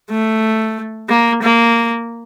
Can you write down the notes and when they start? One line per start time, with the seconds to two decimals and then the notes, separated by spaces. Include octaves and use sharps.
0.11 A3
1.10 A#3
1.43 A#3